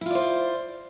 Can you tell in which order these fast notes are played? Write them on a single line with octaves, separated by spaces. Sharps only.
E4 F4 D5 C5